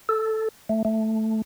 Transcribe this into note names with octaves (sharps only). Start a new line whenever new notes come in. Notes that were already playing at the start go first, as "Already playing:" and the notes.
A4
A3
A3